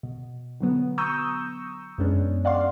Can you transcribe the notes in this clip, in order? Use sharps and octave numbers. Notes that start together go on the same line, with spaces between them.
B2
D3 F#3 B3
A#5 C#6 D#6 E6 G6
F#2 B2 G#3 B3 C#4 D4
D5 F5 F#5 C6